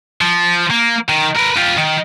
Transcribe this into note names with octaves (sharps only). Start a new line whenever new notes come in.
F3
A#3
D#3
A#4 B4
F4 G4
D#3